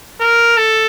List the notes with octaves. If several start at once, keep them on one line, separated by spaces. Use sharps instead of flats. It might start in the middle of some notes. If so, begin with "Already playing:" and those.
A#4
A4